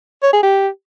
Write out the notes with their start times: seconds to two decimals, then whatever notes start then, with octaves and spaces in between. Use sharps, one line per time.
0.23 C#5
0.33 G#4
0.43 G4